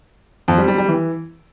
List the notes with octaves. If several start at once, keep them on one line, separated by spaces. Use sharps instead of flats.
F2
G3
G3
G3
E3